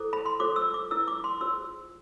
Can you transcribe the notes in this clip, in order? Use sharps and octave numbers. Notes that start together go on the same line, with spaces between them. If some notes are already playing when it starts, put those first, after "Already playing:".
Already playing: E4 A4 C5 D6
B5
C6
F4 A4 C5 D6
E6
D6
E4 B4 E6
D6
C6
F4 G#4 C5 E6